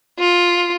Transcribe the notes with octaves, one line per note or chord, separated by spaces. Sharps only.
F4